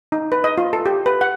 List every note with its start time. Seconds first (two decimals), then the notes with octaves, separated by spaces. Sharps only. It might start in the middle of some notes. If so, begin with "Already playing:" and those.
0.12 D#4
0.32 B4
0.44 D#5
0.58 F4
0.73 A4
0.86 G4
1.06 B4
1.21 F#5